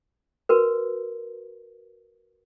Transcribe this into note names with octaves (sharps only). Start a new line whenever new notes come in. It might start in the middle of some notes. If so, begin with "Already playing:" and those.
F#4 A#4 B4